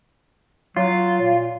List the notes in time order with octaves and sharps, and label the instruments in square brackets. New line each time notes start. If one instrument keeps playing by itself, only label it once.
[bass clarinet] F#3 [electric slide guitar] F4
[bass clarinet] A#2